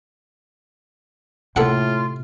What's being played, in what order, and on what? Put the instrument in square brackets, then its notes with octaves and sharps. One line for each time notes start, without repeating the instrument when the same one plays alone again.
[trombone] A2 [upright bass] C3 [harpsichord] A#3 A4 F#5 [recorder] F4